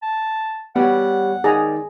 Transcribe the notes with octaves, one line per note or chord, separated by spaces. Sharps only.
A5
G3 B3 G4 C#5 F#5
D#3 G#4 D5 A#5